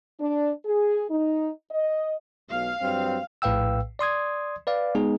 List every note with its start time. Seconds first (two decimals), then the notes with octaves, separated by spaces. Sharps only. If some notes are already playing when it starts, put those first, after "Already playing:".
0.20 D4
0.65 G#4
1.10 D#4
1.71 D#5
2.51 B1 F5
2.80 G2 F#3 C4
3.42 A#1 A2 B4 F5 G5 E6
3.99 D5 C6 D#6 G#6
4.67 B4 D5 F5
4.95 G#3 B3 D#4 G#4